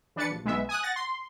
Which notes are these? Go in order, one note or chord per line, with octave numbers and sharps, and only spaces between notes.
E3 D4 B4 A6 C#7
A#1
B1 G#3 B3 E5
G#5 D#6 F#6
F#5 A6 A#6
C6